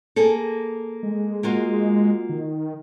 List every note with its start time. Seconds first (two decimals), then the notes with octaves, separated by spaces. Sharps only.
0.16 A#3 G#4 A4
1.03 G#3
1.43 A#3 F4 F#4
2.29 D#3